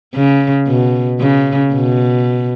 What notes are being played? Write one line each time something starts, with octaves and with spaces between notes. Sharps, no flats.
C#3
B2
C#3
B2